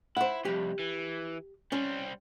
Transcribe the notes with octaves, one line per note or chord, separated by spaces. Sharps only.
E4 C5 F#5
C2 F2 G4
E3
G3 C4 C#4